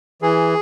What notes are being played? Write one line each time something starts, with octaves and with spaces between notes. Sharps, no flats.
E3 G#4